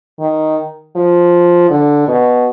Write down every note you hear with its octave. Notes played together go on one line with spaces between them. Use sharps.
D#3
F3
D3
B2